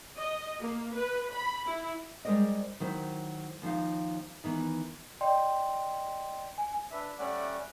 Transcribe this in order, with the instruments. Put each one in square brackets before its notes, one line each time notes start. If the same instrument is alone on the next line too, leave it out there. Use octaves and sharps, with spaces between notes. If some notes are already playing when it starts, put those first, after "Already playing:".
[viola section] D#5
A#3
B4
B5
E4
[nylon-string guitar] G3 G#3 A#4 C5 D5 D#5
D#3 F#3 E4 C5
D#2 F3 D#4 F5
D#3 E3 B3
[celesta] D5 D#5 G5 C6
G#5
[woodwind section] D4 B4 E5
[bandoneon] G3 A3 C#4 [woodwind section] D5 E5 F#5